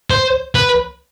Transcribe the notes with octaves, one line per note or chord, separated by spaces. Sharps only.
C5
B4